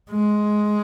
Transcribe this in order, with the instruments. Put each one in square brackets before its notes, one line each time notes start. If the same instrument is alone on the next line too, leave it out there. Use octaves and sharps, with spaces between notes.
[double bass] G#3